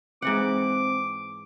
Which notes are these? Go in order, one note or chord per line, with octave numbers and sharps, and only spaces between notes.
G#2 E3 C4 F#5 D6